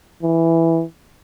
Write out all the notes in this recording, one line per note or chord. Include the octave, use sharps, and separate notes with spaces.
E3